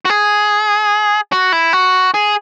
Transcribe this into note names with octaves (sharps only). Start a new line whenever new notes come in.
F#4
G#4
F#4
E4
F#4
G#4